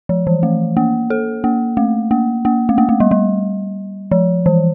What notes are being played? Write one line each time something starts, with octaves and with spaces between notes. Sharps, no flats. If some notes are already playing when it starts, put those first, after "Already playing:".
F3
E3
A3
A#3
A4
A#3
A3
A#3
A#3
A3
A#3
A3
G3
G3
F3
E3